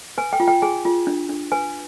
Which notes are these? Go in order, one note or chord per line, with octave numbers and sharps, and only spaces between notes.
B4 G#5
G5
F4
G5
G#4 G#5
F4
D4
D4
B4 G#5